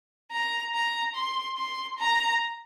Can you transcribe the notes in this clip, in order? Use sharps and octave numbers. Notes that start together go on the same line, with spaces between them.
A#5
A#5
C6
C6
A#5